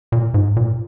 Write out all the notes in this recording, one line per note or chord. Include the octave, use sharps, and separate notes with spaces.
A#2
G#2
A#2